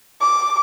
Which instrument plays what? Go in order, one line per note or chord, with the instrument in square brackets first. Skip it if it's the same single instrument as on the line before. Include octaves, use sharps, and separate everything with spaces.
[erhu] D6